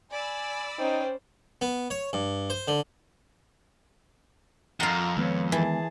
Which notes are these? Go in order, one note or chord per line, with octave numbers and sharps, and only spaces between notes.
D5 G#5 B5 E6
C#4 D#4 C5 G5
B3
C#5
G2
C5
D3
F2 F4 F#5 A#5
D#3 G#3 B3 B4 C#5
E3 G#4 A5